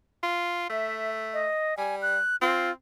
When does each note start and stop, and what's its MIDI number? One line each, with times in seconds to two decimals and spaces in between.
0.23 0.69 65
0.70 1.47 57
0.70 1.10 76
1.33 1.77 75
1.77 2.18 55
1.77 1.95 80
2.02 2.36 90
2.41 2.70 60
2.41 2.71 65